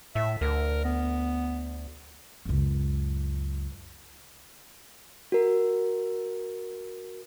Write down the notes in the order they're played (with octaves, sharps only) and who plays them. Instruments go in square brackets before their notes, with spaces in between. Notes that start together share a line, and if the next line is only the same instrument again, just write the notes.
[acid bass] A2 [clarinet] E5
[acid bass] D2 [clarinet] A#4
[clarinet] B3
[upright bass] C#2 F#2
[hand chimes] F#4 A#4